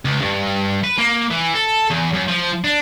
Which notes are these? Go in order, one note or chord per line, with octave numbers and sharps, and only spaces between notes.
C#2
G2
B4
A#3
E3
A4
E2
F#2
F3
D4